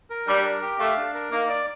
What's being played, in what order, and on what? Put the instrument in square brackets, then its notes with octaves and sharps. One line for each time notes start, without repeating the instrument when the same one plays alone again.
[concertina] A#4
[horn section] G3 [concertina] D4
[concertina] A#4
G4
[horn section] A3 [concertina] F5
[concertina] D4
A#4
[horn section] A#3 [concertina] D#4
[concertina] D5